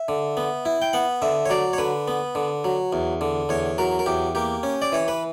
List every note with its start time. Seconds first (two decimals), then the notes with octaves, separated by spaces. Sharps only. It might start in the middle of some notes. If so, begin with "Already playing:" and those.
Already playing: E5
0.08 D3
0.37 B3
0.65 E4
0.82 G5
0.93 B3 F#5
1.22 D3 E5
1.45 C#5
1.50 F#3 D5
1.73 C#5
1.78 D3 B4
2.08 B3
2.35 D3
2.64 F#3
2.93 E2
3.21 D3
3.49 E2 C#5
3.78 F#3 A#4
3.99 A#4
4.06 E2 G4
4.35 A#3 G4
4.63 C#4
4.82 D5
4.92 E3 C#5
5.08 B4